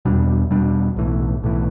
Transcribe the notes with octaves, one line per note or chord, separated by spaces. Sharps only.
E2 B2 G3 D4
E2 B2 G3 D4
B1 A2 E3
B1 A2 E3